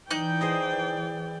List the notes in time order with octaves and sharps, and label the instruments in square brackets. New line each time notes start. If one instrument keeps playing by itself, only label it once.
[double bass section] E3 [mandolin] D#4 F#6 G6 [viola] D5 G5
[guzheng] G#4 C5 D#5